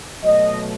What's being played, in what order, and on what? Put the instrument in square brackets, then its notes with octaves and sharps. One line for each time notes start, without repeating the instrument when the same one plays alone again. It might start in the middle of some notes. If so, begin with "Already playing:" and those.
[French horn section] B2 F#3 A3 D#5